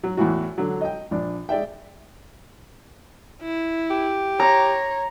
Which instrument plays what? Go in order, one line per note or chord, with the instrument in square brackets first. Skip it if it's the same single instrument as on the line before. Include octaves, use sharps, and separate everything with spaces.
[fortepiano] F#3
E2 A2 E3 F#4
D3 F#3
D#5 G5
A#1 D4
G#3 D5 E5 G5
[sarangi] E4
[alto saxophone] G4
[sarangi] C#5 [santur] A#5